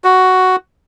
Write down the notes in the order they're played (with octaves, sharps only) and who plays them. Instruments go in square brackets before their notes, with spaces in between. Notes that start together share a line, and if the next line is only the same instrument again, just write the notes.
[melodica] F#4